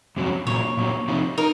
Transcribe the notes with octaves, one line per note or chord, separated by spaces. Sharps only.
F2 C3 F#3 C#4
A#2 F#3 A#3 C#5
A#2 F#3 A#3
C3 F3 C4 D#4
D#4 A#4